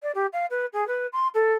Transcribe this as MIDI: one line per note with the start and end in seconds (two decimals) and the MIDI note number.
0.03 0.12 74
0.15 0.26 67
0.33 0.46 77
0.51 0.66 71
0.73 0.87 68
0.88 1.07 71
1.13 1.28 84
1.34 1.54 69